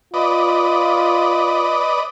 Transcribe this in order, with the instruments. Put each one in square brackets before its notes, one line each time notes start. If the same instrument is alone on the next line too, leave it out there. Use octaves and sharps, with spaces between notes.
[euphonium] F4 [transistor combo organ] B4 D5 D#5